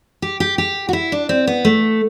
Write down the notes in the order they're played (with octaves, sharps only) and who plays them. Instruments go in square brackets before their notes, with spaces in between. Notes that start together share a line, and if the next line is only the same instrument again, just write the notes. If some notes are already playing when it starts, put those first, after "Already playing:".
[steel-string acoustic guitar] G4
G4
G4
F#4
E4
D4
C4
B3
A3